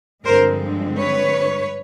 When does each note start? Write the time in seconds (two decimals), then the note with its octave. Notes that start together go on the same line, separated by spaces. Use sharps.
0.24 G2 D3 F3 G#3 C4 A#4 C5
0.97 B4 C#5